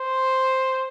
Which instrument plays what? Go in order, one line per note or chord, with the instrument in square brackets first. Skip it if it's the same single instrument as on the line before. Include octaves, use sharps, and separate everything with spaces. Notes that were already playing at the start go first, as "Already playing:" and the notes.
Already playing: [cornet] C5